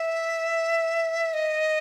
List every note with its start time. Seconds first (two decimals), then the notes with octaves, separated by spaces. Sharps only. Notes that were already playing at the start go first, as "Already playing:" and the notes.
Already playing: E5
1.33 D#5